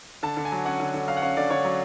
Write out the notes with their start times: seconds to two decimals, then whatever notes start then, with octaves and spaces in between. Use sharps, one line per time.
0.23 D3 A5
0.37 D3
0.45 G#5
0.52 F#3
0.65 C#4 F#5
0.80 D3
0.94 D3
1.08 F#3 F5
1.16 F#5
1.22 C#4 F5
1.37 D3 D5
1.50 D3 C#5
1.65 F#3